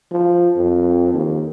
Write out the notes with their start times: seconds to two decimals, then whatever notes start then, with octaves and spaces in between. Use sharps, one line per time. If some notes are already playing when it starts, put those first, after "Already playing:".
0.11 F3
0.56 F2
1.14 D#2